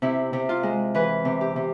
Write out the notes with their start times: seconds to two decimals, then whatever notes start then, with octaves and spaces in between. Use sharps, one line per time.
0.02 C3 E4
0.33 C3
0.49 F4
0.63 G#3
0.94 E3 B4
1.25 C3
1.41 G4
1.56 C3